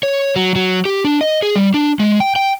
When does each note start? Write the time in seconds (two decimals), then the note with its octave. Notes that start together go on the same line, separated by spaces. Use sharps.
0.03 C#5
0.36 F#3
0.56 F#3
0.85 G4
1.05 D4
1.21 D#5
1.42 G#4
1.56 G3
1.74 D4
2.00 G#3
2.20 G5
2.36 G5